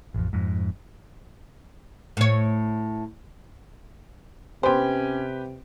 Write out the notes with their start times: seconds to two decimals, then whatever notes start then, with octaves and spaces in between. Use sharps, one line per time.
0.14 A1 F2
0.33 F2 G#2
2.17 A2 C#5
4.63 C3 B3 C#4 G4 B4 C5 G5